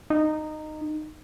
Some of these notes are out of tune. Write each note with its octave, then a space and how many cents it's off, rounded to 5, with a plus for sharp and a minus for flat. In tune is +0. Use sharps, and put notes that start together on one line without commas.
D#4 -15